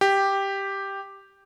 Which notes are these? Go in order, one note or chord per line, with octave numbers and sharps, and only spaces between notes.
G4